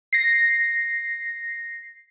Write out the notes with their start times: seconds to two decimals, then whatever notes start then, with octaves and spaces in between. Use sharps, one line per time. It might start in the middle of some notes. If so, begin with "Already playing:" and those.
0.13 A#6 C7